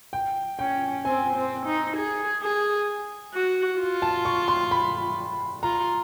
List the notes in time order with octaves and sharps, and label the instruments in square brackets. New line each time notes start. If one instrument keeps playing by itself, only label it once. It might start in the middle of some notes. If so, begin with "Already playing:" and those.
[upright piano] G5
[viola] C#4 [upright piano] G5
[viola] C4 [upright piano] G#5
[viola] C4
D#4
G#4
G#4
F#4
F4
[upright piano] A5
C#6
C6
B5
[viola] F4 [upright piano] A#5